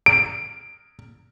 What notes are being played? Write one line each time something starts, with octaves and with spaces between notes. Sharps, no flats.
D7